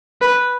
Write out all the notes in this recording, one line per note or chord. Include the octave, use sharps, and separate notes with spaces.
B4